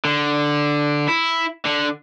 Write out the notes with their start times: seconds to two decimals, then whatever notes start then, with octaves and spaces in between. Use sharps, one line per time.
0.05 D3
1.08 E4
1.65 D3